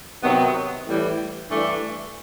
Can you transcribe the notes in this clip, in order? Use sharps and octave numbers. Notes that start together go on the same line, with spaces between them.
C3 D#3 F#3 B3
A2 E3 G3
G2 E3 A3 D4